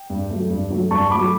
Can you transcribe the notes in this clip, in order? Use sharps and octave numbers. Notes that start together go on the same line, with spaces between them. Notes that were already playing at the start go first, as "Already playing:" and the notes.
Already playing: G5
G2
F#3 A3
G2
F#3 A3
G2 A5 C#6
F#3 A3 B5 D6